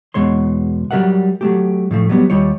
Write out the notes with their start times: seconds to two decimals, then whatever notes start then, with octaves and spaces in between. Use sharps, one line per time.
0.14 E2 B2 G#3 C#5 C6
0.91 F#3 G3 A#4 E5 F#5
1.41 F#3 A3 G4
1.91 A2 F3 A3
2.09 F#3 G3 B3
2.30 D#2 G3 F4 C#5